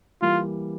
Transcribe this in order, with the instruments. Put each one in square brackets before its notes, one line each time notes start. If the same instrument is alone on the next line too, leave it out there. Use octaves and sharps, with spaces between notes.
[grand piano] E3 G3 A#3 [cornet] F4